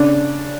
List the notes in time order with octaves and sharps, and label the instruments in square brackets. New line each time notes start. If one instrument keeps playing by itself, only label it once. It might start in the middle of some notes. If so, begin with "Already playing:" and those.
Already playing: [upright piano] C#3 D4